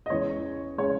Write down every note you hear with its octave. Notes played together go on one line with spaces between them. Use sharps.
D#5
E2 C#3 G#3 C#5
C#3 G#3 C#5